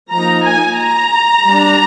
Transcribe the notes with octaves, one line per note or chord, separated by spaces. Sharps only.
F3 A#3 D#4 A#5
G#5
A#5
G3
D4